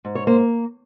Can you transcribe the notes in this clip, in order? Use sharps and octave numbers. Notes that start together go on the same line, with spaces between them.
G#2
C#5
A#3 C5